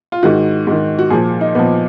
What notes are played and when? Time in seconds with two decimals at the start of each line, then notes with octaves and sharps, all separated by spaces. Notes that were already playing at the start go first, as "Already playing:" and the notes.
0.12 F4
0.23 G#2 D#3 F#4
0.67 G#2 D#3
0.99 F#4
1.10 A#2 F3 G#4
1.41 D#4
1.55 A#2 B3
1.59 F3